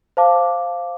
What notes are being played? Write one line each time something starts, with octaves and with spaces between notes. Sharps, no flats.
C5 F5 A5 D6